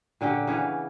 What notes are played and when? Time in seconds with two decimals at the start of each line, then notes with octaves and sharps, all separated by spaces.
0.21 A#2 D3 C#4 G4
0.47 C#3 E3 B3